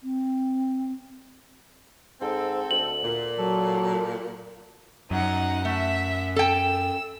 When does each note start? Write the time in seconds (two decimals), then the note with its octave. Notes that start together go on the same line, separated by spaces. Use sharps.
0.03 C4
2.21 G#2 C4 A4
2.71 D2 F#7
3.04 A#2
3.39 F#3 A4
5.11 F#2 D#4 F#5
5.65 A3 E5 F#5
6.36 A4 G5 E6